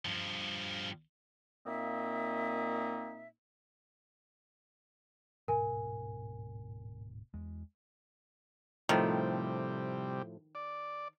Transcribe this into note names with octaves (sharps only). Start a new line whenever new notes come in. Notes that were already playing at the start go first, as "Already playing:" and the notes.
G2 F3
A#2 A#3 C4 D#4 D#5 E5
D1 G#2 B2 A#4 G#5
E2 G#3
A2 C3 D#3 F3 G3 A3
D5